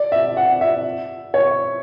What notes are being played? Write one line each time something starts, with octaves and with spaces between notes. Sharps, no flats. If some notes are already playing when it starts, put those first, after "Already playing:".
Already playing: D5
E5
F#5
E5
C#5